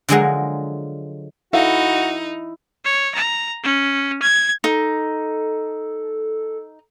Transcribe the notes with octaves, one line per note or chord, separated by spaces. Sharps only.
D3 F3 F#3 G#3 G#4 A#4
D#4 E4 F#4 A4 F5
C#5
A#5
C#4
G#6
D#4 A4